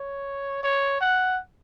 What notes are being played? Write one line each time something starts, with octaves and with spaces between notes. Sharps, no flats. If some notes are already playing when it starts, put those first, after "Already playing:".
Already playing: C#5
C#5
F#5